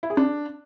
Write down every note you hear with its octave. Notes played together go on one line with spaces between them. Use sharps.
E4
G#4
D4